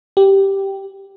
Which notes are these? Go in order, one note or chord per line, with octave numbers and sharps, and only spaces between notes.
G4